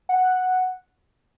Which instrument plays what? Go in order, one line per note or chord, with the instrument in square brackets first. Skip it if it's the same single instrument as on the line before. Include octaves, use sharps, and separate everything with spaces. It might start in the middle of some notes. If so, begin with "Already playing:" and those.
[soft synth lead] F#5